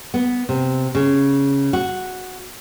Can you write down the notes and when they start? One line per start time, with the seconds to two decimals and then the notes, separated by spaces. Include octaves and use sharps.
0.14 B3
0.49 C3
0.95 C#3
1.73 F#4